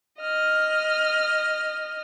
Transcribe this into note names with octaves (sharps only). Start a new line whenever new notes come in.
D#5 F6